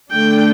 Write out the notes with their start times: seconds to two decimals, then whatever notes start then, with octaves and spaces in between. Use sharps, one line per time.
0.10 D3 A3 D4 G5